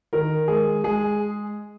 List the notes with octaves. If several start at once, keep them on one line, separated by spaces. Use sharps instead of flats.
D#3 A#4
G#3 G#4
G#3 G#4